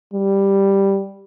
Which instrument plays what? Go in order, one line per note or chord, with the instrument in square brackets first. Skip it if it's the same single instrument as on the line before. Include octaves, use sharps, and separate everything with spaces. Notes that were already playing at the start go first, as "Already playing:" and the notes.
[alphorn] G3